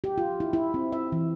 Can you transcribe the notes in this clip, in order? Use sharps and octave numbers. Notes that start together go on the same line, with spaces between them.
G4
F4
E4
E4
C4
E5
E3